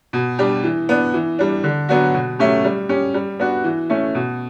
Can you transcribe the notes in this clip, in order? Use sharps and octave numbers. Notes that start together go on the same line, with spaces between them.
B2
G3 D4 G4
E3
B3 D4
E3
G3 D4
D3
F#3 B3 D4 F#4
B2
F#3 A3 C#4 G4
G3
C#4 G4
G3
B3 D4 F#4
E3
A3 C#4
B2